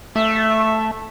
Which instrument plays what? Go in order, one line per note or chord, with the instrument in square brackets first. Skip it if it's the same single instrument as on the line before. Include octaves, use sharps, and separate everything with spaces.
[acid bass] A3 [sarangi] E5